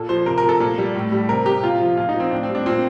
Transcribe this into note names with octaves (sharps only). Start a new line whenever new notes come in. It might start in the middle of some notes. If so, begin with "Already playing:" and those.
Already playing: A#2 A4
F3 C5
C3 A#4
A#4
F3
A4
A#2
G3
A2
G3
C3 A#4
C3 G4
A#2 F4
F3
A#2 F4
D#4
F3
C4
A2 D4
C4
G3
D4
A#2 C4